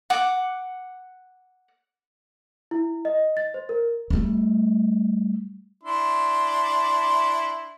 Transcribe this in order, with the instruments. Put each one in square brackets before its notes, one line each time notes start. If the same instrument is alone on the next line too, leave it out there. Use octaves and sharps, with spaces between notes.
[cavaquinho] F#5 D6
[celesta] E4
D#5
A6
C5
A#4
[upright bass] G3 A3
[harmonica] D4 E4 C6